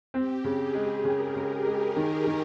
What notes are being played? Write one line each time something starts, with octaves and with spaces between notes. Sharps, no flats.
C4 G4
C#3
G#4
G#3
C#3 A#4
C#3
G#3
D#3
D#3